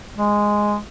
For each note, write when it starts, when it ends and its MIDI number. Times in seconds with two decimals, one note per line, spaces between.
0.18 0.77 56